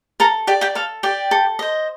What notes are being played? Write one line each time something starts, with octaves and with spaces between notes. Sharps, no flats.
A4 A#4 A#5
G4 D5 G5
G4 G5
A4 F5
G4 D5 G5
A4
C5 D#5